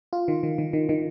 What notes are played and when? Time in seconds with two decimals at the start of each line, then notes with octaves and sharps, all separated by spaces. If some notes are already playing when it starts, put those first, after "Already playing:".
0.13 F4
0.28 D#3
0.43 D#3
0.58 D#3
0.73 D#3
0.89 D#3